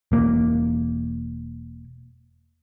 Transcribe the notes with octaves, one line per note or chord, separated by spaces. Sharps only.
E1 A#3